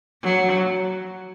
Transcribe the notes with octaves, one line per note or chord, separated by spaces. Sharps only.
F#3